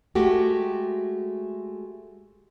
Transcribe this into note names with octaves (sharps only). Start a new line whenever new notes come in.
G#3 A3 F#4 G4